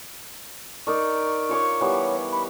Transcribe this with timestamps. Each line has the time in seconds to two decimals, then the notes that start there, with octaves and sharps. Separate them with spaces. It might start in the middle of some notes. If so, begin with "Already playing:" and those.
0.87 D#4 A#4 D5 C#6
1.49 F4 C#5 D6
1.81 E3 G3 B3 C#5
2.32 B5